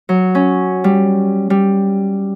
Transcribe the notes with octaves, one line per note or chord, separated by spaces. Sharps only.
F#3
C#4
G3
G3